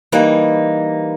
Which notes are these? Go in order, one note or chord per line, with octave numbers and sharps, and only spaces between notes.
E3 G3 A#3 D#4